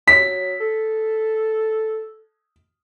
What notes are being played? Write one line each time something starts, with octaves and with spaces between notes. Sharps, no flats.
F#3 B6
A4